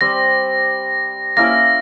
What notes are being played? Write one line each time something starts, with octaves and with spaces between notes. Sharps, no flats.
G3 C4 G4 A#6
A#3 C#4 E4 A#4 A#6